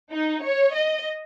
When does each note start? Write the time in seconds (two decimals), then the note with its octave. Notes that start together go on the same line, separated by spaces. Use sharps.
0.11 D#4
0.43 C#5
0.74 D#5